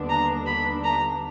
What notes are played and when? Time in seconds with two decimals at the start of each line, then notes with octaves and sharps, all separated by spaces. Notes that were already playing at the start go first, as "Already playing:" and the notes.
Already playing: D#2 D3 G3 B3 D4
0.09 A#5
0.46 B5
0.84 A#5